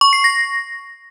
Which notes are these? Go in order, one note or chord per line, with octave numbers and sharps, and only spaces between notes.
C#6
C7
A#6